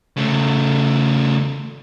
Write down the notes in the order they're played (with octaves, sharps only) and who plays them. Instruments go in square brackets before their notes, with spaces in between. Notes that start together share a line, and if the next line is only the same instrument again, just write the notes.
[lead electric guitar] C#3 A3